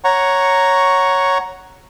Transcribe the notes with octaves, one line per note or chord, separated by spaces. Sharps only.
C#5 F#5 A#5 C#6